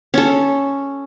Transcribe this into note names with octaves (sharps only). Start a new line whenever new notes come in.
C#4 A4